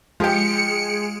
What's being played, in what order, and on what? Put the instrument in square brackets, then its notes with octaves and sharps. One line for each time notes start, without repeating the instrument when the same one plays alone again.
[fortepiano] F3 G4 [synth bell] G#3 G#4 D7 [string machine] C#7